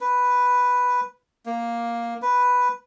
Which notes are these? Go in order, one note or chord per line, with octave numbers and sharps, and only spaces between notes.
B4
A#3
B4